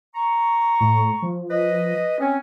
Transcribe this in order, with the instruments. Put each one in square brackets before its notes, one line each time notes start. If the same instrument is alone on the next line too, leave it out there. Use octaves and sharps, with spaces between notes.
[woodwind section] A#5 C#6
[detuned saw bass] A2
F3
[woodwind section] B4 D#5
C4 C#4